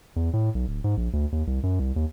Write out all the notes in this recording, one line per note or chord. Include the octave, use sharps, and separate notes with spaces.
E2
A2
B1
D1
G#2
A#1
D2
D#2
C2
F#2
C2
D#2